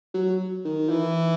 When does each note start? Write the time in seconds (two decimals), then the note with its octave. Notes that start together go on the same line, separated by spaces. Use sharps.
0.14 F#3
0.65 D#3
0.89 E3